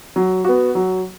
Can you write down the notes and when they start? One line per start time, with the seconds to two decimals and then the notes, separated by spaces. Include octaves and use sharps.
0.16 F#3
0.45 B3 F#4
0.75 F#3